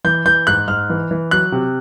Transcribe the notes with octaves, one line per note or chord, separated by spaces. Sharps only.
E3 G6
E3 G6
G#2 F#6
G#2 F6
E3
E3
F#3 F#6
C3